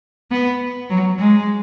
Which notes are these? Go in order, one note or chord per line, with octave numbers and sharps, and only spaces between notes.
B3
F#3
G#3